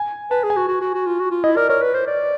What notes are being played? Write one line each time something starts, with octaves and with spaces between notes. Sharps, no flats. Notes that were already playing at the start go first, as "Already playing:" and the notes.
Already playing: G#5
B4 A5
G#4
G#5
F#4
F#4
F#4
F#4
F4
F#4
F4
E4 D#5
A#4 D5
A#4 C#5
B4
C5
D5